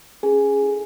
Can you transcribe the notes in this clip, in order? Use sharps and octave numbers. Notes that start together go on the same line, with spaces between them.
C#4 G#4 G#5
E4 A4